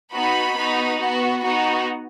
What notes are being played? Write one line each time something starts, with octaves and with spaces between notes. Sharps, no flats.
B3 D#4 F#4 B5
B3 D#4 F#4
B3 F#4
B3 D#4 F#4